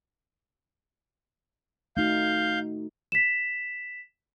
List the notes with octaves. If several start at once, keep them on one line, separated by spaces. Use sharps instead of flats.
A3 D#4 F#4 F5 G6
B6 E7